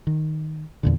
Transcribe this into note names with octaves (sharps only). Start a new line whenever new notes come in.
D#3
E2 A#2 D3